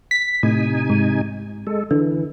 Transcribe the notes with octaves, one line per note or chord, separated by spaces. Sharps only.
B6
A2 C3 D#4 G#5
G#2
G#3 A4
D3 E3